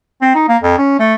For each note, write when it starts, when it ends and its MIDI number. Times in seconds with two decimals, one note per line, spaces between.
0.21 0.30 60
0.35 0.47 63
0.48 0.57 58
0.63 0.75 41
0.78 0.96 61
0.99 1.15 57